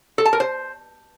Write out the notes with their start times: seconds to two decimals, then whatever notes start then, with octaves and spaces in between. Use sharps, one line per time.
0.18 A4
0.25 A5
0.33 A#4
0.40 C5